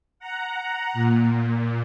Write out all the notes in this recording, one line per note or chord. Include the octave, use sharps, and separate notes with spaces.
F#5 A#5
A#2